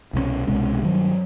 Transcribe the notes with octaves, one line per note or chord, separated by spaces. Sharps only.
C2 B2 G#3 C#4
C2 B2 G#3 C#4
G2 D#3 F#3